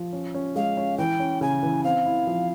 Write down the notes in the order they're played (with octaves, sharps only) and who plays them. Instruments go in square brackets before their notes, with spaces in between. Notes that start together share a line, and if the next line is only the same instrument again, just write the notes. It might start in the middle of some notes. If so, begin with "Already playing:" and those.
Already playing: [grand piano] F3
C#4
C#4
[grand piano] G#3 [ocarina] F5
[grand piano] C#4
[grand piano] E3 [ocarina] G5
[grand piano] C#4
[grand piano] C#3 [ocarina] G#5
[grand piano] E3
[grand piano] C4 [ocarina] F5
[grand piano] E4
F3